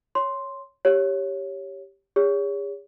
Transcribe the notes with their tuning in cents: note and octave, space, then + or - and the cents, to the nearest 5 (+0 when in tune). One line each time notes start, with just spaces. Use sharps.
C#5 +0 C6 +0
G4 +0 C#5 +0
G#4 -45 C#5 +25